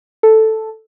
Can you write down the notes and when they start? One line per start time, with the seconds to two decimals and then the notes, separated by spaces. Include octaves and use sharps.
0.23 A4